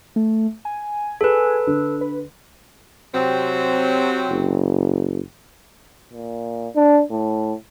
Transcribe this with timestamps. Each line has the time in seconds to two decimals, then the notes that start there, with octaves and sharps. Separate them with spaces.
0.16 A3
0.65 G#5
1.21 G#4 A4 B4
1.67 D3
2.01 B4
3.14 C3 F#3 C4
4.31 F#1
6.13 A#2
6.75 D4
7.10 A2